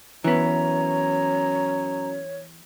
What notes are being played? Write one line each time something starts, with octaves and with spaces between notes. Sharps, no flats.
F#2 E3 B3 C#5 A#5